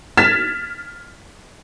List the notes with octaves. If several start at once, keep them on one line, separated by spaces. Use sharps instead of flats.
F6 G#6 A6 B6 E7